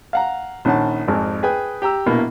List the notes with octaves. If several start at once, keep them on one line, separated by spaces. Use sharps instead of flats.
F5 F#5 A#5
A#1 D#3 C#4 F#5 A5
G#1 F2 G#4
G#4 B4 G5 G#5
G4 G5 A#5 E6
A#1 B2 A#3 E4